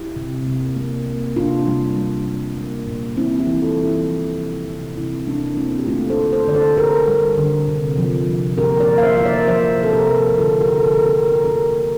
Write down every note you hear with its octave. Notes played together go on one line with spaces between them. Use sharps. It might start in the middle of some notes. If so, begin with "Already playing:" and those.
Already playing: E4 G4
C3
A#3
A#3
A#3
C3 D4 F4
G3
G3
G3
A#3
A#2
E3 C4 E4
E4 G4
E3
F4 A4
G3
E4 G4
F3
C3
C3
C3 C4 E4
A#3 D4
A#3 C4 E4
G4
A3 D4 F4
A4 C5
D3
A4 C5
D3 D5
A4 C5
D3 G4 A#4
G3
D3
C3
F3
C3
A#3 G4 A#4
A#4 D5
F3
F5
C5 E5
A#3 E5
A#4 D5
F3 C5 E5
C3
A4
G4 A#4
F3
D3 F4 A4
G4 A#4
D3
A4
G4 A#4
A#3 A4
G4 A#4
A#3 A#4
A4
G4 A#4
A#3